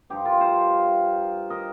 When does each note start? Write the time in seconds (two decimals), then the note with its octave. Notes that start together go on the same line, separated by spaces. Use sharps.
0.10 G2 F3 D#4 G4
0.25 F4 A#4
0.41 C5 F5
1.50 A#4 D#5